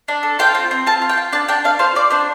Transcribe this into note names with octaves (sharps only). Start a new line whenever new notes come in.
D4
A4
F4 G5
C4
C4
F4 A5
F4
G5
F4
D4 A5
D4 G5
D4 F5
F4 C5
F4 D5
D4 C5